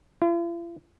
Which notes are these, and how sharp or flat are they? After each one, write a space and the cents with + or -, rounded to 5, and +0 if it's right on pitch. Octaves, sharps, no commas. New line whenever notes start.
F4 -45